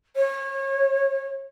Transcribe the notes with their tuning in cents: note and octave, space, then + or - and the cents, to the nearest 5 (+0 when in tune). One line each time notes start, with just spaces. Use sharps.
C#5 -30